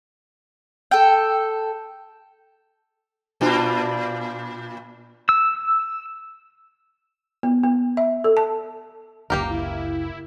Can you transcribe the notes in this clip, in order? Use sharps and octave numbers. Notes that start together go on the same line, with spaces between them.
A4 G5
A#2 D4 F4
E6
B3
B3
E5
A4
A5
F#1 C#2 A#3 G4 A#4
E4